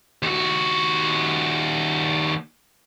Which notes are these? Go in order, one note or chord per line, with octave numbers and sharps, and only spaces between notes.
D#2 F#4